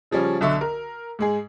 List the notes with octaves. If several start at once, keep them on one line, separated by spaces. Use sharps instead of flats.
C#3 F3 G3 C#4
B1 D3 E5 C#6
A#4
G#2 G#3 G#4